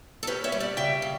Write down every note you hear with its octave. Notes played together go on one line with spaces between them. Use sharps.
A4
C#4 G4 B4
C#5 E5
G3
D5 F#5
C#3 E5 G5
C#3